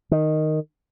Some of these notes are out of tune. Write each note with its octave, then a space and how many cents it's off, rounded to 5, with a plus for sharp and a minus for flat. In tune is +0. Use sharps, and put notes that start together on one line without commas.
D#3 -5